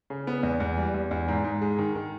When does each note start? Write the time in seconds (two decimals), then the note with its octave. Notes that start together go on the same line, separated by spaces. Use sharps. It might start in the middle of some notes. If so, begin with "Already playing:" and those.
0.10 C#3
0.27 B3
0.43 E2
0.60 E2
0.77 G3
0.94 E2
1.11 E2
1.28 G#2
1.44 G#2
1.61 G#3
1.78 D#3
1.95 D#3